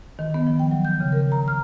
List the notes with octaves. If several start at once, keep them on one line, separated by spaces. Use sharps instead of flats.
D#3
B3
F3
G5
F#3
G6
C#3
A#4
A#5
F6